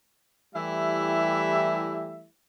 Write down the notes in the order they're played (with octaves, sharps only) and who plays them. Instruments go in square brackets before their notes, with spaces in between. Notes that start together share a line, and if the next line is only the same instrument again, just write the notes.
[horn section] E3 G3 A3 E4 G4 E5